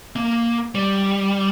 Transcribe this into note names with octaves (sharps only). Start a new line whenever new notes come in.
A#3
G3